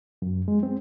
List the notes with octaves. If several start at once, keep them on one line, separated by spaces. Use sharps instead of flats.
F#2
G#3
C4